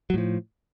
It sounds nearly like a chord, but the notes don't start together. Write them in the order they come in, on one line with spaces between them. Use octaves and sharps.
F#3 A2 F3